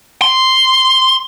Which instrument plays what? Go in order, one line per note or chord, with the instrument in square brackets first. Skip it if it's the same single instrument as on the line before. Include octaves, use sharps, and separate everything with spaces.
[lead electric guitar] C6